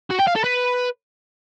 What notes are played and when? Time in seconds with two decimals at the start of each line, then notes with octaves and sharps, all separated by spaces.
0.10 F#4
0.19 G5
0.27 F5
0.35 A4
0.44 B4